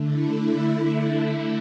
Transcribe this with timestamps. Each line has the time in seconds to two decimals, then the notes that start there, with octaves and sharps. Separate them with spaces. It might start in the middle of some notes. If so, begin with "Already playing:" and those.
Already playing: D3 A3
0.09 E4